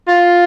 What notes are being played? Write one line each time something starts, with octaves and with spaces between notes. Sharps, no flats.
F4